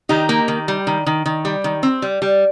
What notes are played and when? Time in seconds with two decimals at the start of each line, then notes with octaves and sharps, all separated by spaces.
0.09 D#3 D#4 G4
0.29 A#3
0.48 D#3
0.68 G3
0.87 D#3
1.06 D#3
1.26 D#3
1.45 G3
1.64 D#3
1.83 C4
2.02 G3
2.22 G3